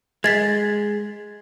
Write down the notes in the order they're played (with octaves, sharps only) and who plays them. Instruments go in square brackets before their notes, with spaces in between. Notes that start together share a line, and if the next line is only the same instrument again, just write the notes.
[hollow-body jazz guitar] G#3 [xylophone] G#6 A6 B6